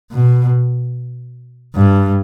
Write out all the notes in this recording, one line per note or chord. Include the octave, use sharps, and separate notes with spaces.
B2
G2